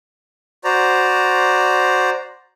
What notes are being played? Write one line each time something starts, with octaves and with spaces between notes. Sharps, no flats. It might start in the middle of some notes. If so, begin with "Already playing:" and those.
F#4 C5 D5 A#5